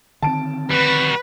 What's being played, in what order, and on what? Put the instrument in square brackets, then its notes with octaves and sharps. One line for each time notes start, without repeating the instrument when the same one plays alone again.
[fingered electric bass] D3 D#3 C4 [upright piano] A5 D7
[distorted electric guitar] G3 F#4 [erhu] B4 [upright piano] F#6